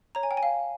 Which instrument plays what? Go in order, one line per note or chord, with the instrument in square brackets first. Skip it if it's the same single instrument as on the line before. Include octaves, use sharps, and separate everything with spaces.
[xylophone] C#5 A#5
G#5
G5
G#5
F5